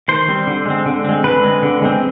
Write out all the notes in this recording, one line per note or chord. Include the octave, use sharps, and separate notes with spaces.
D#3 C5
G3 C4
D3
G#3 C4
D3
G#3 C4
D3 B4
G#3 C4
D3
G#3 C4